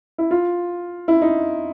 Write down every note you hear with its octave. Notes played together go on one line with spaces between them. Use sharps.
E4
F4
E4
D#4